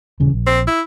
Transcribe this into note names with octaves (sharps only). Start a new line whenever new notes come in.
D#1 C#3 E3
A#1
C4
E4